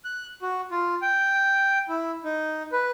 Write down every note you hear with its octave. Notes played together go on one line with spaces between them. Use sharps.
F#6
F#4
F4
G5
E4
D#4
B4